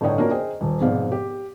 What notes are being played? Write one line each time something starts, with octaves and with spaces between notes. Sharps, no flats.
G1 A2 D3 C#5 D#5 G5
A#3 C#4 D4 F4 F#4 A#4
G#4 C5 D#5 G5
D#1
F1 G#2 B2 C4 D5 F5
G4